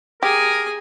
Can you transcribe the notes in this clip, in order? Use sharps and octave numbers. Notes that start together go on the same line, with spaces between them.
G4 G#4 A#4 G#5